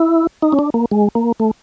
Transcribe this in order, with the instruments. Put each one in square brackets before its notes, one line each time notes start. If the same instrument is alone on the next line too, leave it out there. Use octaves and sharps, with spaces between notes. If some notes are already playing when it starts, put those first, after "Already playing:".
Already playing: [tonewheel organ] E4
D#4
C#4
D4
A#3
G#3
A#3
A3